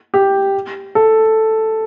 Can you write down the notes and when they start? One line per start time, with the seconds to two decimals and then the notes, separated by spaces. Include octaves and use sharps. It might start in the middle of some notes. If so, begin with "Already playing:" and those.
0.14 G4
0.95 A4